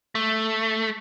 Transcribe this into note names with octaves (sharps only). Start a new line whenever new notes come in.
A3